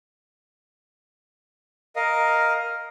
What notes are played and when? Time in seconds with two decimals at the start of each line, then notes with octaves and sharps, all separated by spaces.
1.96 A#4 D#5 F5